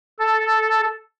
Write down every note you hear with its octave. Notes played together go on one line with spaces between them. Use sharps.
A4